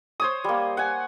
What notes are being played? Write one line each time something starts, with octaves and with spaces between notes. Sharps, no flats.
C5 C#5 D#6
G3 A#3
F#5 G#5